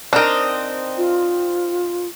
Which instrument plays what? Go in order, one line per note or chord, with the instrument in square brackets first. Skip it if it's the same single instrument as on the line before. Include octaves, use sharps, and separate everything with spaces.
[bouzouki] C4 D#4 [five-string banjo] D4 A#4
[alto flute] F4